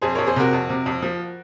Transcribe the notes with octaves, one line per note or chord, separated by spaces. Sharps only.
F2 G#4 C5
F2 A#4 C#5
G#4 C5
C3 F#4 A#4
F2
C3
F2
F3